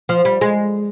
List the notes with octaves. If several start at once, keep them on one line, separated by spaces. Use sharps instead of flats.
F3
G3
G#3